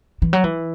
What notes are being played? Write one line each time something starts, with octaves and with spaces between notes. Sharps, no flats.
E3
F#3
E3